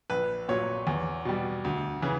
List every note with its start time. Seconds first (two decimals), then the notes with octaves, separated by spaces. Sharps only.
0.10 A#1 B4
0.49 A#2 F#3 C#5
0.87 E2
1.25 B2 G3
1.65 D2
2.02 C#3 E3